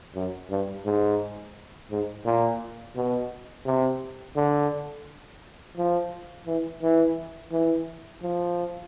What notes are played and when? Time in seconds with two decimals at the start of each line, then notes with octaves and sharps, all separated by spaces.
0.15 F#2
0.50 G2
0.85 G#2
1.91 G#2
2.25 A#2
2.96 B2
3.65 C3
4.36 D3
5.77 F3
6.47 E3
6.82 E3
7.52 E3
8.22 F3